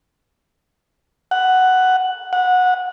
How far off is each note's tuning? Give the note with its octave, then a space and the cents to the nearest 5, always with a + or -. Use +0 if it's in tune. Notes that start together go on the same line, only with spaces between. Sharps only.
F#5 +5
F#5 -20